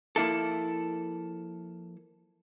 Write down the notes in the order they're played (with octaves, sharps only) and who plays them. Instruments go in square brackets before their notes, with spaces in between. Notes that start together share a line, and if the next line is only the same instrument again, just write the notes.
[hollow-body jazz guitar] F3 A#3 E4 A4